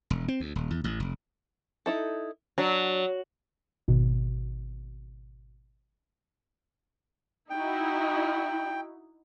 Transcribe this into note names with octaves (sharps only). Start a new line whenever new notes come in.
E1
C4
D2
D#1
E2
A1
F1
D#4 E4 A4
F#3 D4
G#1 B2
D#4 E4 F#4 G5